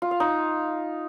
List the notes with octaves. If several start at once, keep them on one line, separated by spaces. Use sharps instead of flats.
F4
F5
D#4